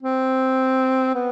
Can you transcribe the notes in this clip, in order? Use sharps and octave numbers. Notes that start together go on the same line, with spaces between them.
C4
B3